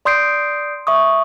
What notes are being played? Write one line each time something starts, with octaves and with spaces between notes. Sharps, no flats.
D5 C6 D#6 G6 C7 D7
E5 C#6 D#6